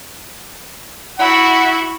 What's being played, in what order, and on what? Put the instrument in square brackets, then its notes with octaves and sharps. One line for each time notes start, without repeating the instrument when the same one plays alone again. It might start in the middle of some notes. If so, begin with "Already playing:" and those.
[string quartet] E4 F#4 [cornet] F#5